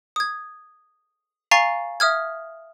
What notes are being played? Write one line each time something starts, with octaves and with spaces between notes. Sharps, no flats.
D#6 G#6
F5 G#5 A#5 C#6 A6 C7
E5 D#6 F6 G#6